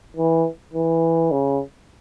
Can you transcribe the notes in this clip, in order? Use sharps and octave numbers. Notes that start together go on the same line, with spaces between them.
E3
E3
C#3